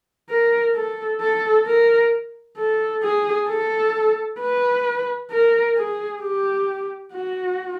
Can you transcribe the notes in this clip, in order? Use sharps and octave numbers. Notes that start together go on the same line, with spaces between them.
A#4
A4
A4
A#4
A4
G#4
A4
B4
A#4
G#4
G4
F#4